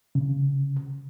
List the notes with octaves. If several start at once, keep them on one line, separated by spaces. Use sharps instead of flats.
C#3